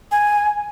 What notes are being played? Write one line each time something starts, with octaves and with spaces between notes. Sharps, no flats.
G#5